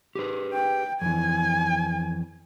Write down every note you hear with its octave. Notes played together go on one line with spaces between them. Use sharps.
G4 G#4 B4
G5
F2 E3 G#5